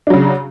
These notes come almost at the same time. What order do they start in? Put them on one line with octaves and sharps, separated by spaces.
D4 F#3 C#3